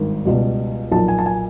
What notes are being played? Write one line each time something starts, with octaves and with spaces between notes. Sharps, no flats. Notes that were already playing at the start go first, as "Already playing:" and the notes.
Already playing: G#1 G2 D#3
C#2 B2 G3
B1 A#2 F3 A5
G#5
A5
G#5